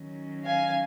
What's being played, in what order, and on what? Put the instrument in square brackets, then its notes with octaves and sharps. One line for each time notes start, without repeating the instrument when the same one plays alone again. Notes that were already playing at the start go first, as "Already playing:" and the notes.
Already playing: [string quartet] D#3 F#3 C#4
F5 G#5